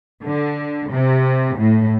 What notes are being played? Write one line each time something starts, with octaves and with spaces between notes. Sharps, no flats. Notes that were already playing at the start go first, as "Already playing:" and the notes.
D3
C3
A2